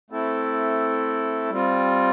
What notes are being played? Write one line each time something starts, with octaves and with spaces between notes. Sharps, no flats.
A3 C4 E4 A4
G3 C4 F4